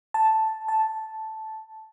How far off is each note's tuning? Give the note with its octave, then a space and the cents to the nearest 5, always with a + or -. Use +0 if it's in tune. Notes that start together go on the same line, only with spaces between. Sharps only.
A5 +0
A5 -5